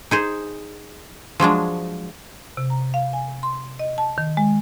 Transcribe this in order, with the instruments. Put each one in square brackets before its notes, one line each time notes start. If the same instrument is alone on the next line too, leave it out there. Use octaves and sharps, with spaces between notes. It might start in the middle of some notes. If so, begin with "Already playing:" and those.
[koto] D#4 G#4 C5
F3 F#3 G#3 D4
[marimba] C3
A#5
F5
G#5
C6
D#5
A5
D#3
G#3